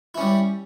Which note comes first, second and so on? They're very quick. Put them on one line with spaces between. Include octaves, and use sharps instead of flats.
E4 C#4 G3